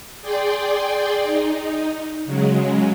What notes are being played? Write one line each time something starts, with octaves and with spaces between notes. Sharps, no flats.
G#4 D5 G5 C6
D#4
C#3 F#3 G#3